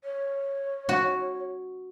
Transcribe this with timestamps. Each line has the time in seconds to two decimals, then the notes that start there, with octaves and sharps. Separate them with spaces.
0.04 C#5
0.89 F#4